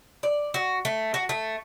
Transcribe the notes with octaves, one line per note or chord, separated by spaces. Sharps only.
D5
F#4
A3
F#4
A3